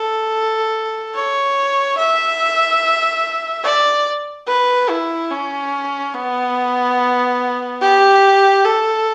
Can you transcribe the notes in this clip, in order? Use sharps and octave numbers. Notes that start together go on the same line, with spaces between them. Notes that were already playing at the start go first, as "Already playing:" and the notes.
Already playing: A4
C#5
E5
D5
B4
E4
C#4
B3
G4
A4